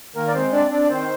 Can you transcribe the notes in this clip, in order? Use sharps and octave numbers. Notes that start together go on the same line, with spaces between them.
D#3 A#3 A#4
D5
G#3 C4 C5
C4 D4 D5
C4 D4 D5
D#3 C4 C5